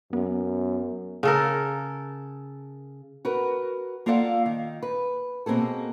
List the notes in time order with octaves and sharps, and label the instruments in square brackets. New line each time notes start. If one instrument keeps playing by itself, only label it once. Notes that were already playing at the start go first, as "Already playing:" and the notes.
[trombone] F#2 [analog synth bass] B3
[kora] C#3 A4 A#4
[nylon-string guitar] F#4 A#4 B4
A#3 F4 A4 D5 F5 F#5
D#3
B4
B2 A#3 C4 G#4 A4